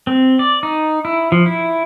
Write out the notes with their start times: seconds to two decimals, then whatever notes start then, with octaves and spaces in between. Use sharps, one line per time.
0.07 C4
0.39 D5
0.63 D#4
1.05 E4
1.32 F3
1.46 E4